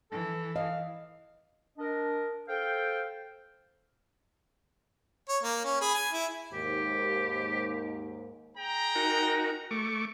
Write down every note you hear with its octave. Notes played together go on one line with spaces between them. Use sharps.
E3 A4
D#5 F5
D4 A#4 D#5
A4 C5 F5 G5
C#5
A#3
C#4
G#4 B5
G#5
E4
D#2 G#2 G4
G#4 G5 A#5
D#4 F#4 A#4
A3 C#6 D6